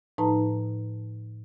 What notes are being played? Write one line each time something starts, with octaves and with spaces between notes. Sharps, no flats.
A2 F3 D#4 B4 A5 A#5